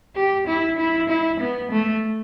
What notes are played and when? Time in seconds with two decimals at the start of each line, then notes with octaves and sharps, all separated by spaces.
0.16 G4
0.47 E4
0.79 E4
1.10 E4
1.40 B3
1.72 A3